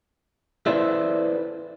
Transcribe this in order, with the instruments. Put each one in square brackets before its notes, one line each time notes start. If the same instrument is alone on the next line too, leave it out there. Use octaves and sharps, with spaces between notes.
[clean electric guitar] E4 A4 B4 C5 D5 E5